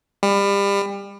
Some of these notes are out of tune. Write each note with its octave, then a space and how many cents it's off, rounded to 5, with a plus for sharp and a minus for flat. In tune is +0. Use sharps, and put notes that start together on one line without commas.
G3 +30